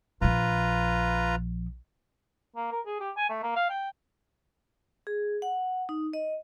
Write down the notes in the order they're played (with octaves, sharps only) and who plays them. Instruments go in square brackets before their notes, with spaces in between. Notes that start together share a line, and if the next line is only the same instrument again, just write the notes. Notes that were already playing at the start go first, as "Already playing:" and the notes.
[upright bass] A#1 F3 [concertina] F4 B4 A#5
[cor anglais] A#3
A#4
G#4
G4
G#5
A3
A#3
F5
G5
[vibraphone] G#4
F#5
D#4
D#5